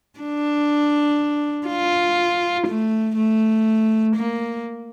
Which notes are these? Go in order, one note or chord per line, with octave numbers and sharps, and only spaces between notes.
D4
F4
A3
A3
A#3